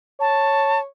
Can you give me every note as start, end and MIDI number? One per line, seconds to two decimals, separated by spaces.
0.20 0.87 73
0.20 0.80 81